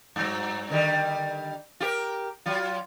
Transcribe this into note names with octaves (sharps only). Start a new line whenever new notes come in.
G2 F#3
D3 D#3 G3
F4 G4 A#4
F#3 F4